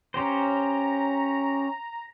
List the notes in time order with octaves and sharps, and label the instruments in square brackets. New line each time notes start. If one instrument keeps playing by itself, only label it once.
[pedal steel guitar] C#4 G4 C5 [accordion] A#5